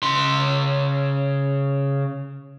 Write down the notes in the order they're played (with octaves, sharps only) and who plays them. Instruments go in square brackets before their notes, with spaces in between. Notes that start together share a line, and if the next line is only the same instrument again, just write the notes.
[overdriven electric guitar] C#3 C6